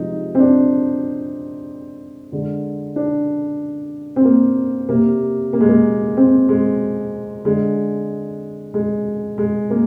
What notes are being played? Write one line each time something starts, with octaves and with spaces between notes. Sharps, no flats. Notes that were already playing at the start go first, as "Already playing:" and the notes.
Already playing: C3 F3 G#3 D#4
C4
D4
D3 G#3
D4
C4
A#3
C3 G3 A#3
A#3
G#3
A#3
C4
G#3
D3 G#3
G#3
G#3
A#3